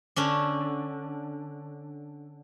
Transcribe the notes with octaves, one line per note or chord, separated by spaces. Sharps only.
D3 C#4 D4